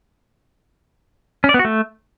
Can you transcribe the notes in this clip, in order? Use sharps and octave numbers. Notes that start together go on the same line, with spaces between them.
C#4
D5
B3
F#4
A3